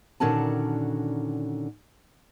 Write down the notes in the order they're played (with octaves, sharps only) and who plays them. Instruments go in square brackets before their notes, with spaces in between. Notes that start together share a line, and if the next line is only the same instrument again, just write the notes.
[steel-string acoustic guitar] A#2 D3 D#3 C#4 F#4 A5